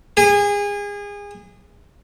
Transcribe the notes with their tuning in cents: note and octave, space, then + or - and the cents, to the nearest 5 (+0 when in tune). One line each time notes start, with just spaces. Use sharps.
G#4 -30